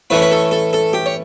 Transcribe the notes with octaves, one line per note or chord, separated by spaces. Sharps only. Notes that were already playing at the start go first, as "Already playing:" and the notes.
A2 E3 A3 C#4 B4
B4
A4
A4
A4
G4
C#5